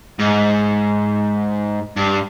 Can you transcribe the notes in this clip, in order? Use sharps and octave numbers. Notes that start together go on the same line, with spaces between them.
G#2
G2